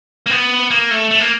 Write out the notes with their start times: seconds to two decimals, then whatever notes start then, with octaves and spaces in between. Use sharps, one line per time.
0.26 A#3
0.31 B3
0.71 A#3
0.91 A3
1.11 A3
1.20 A#3